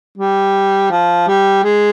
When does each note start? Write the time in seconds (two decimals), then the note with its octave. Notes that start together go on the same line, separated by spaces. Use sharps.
0.18 G3
0.90 F3
1.27 G3
1.64 G#3